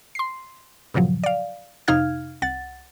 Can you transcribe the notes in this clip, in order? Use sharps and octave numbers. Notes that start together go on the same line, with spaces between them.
C6 C7
G2 A#2 C#3 F3 F#3
D5 F5
F2 C3 D#4 F5 F6 G#6
C2 F#5 A6